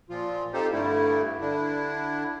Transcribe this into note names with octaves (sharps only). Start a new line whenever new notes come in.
A#2 F3 F4
C4 D#4 F4 G4 A4 C5
G2 D3 G3 A3 E4
D3 D4 E4